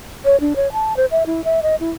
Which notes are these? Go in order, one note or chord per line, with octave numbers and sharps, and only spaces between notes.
C#5
D4
C#5
A5
C5
E5
E4
E5
D#5
E4